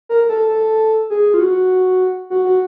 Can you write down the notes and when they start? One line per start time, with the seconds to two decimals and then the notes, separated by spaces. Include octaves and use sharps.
0.09 A#4
0.29 A4
0.49 A4
1.10 G#4
1.34 F4
1.40 F#4
2.30 F#4
2.45 F#4